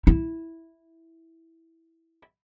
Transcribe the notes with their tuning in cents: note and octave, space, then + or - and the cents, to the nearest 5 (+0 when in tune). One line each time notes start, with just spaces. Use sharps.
E4 -5